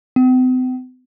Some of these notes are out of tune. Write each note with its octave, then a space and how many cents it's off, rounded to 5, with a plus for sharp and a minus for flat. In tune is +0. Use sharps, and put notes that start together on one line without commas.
C4 -45